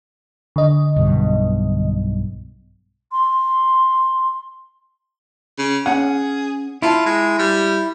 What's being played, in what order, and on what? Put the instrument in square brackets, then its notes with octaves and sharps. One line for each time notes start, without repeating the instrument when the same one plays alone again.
[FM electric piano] D3 D#5
[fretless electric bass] B1 G2 B2
[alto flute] C6
[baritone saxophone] C#3
[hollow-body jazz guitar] C#4 F#5 [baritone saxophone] G#4
[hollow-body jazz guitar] E4 A5 [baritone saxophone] F4
[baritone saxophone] G#3
G3